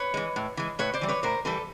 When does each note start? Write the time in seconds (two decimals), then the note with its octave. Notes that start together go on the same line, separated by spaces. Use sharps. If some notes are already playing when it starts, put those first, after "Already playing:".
Already playing: B4 C#5
0.14 E3 G#3
0.36 A2
0.57 E3 G#3
0.79 A2 B4 C#5
0.94 C5 D5
1.01 E3 G3
1.08 B4 C#5
1.23 A2 A#4 C5
1.45 E3 G3 A4 B4